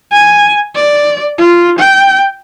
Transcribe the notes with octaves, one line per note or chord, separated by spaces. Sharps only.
G#5
D5
F4
G5